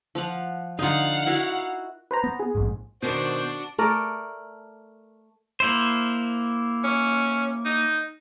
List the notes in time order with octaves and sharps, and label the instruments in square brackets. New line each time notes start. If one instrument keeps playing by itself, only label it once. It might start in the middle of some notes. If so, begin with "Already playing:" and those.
[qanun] F3 F5 F#5
[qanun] D3 [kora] D#4 F4 [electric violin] F5 F#5
[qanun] E4 F#4 A#4
[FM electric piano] B4 C5 A#5
[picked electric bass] B3
[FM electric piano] G#4
[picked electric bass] A#1 G#2
[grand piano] B2 D#3 [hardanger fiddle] D4 F#4 [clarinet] C5
[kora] A3 A#4 D5
[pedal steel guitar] A#3 E4 C5
[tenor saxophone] C#4
D#4